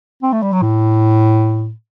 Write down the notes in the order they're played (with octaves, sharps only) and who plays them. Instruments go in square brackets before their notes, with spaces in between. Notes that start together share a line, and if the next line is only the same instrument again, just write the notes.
[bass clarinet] C4
A3
G3
F#3
A2